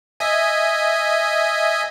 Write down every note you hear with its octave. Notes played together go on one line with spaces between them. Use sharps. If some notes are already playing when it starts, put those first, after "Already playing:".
D#5 E5 G#5